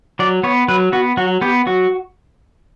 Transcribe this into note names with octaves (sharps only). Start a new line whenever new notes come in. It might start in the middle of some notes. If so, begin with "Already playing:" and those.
F#3 D5
B3 C#5
F#3 B4
B3 F#4
F#3 F#4
B3 G4
F#3 F#4